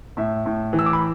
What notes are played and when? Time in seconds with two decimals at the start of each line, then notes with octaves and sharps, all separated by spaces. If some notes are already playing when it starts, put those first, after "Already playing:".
0.17 A2 E5
0.46 A2
0.73 E3
0.79 E6
0.86 D6
0.93 B5